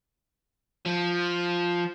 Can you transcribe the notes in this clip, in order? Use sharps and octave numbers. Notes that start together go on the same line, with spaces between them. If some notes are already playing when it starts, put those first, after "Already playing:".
F3